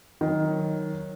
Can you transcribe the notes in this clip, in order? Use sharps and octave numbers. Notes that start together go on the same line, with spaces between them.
D#3 F#3